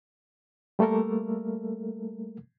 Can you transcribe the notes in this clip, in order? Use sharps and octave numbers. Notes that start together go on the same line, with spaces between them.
G3 A3 A#3 A4 A#4